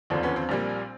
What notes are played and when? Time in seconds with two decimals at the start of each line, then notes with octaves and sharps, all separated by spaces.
0.10 E1 D#2 D3 F3 C4 D4
0.23 B3 C#4
0.36 C4
0.49 A#1 A#2 G3 A#3